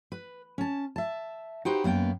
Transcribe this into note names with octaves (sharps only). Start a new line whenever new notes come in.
B4
C#4 A5
E5 A5
D#4 F#4 G4 B4 C5 G5
F#2 A#3 B3 G5